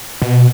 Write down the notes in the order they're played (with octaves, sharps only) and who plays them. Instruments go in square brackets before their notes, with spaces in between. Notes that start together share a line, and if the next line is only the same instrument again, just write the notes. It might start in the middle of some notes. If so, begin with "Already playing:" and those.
[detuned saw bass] B2